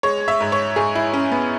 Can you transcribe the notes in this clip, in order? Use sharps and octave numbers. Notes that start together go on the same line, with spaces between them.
G#3 C#5
E5
G#2
C#5
G#2 G#4
E4
G#3 C#4
B3